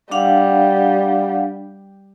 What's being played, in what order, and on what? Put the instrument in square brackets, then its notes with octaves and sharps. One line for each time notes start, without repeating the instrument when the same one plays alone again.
[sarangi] G3 [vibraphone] D4 F5 F#5